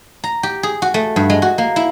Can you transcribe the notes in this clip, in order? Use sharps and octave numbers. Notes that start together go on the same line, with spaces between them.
A#5
G4
G#4
F#4
A3
G2
G#3
F#4
A#3
E4